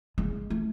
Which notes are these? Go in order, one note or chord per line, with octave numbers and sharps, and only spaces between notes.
G#3
A3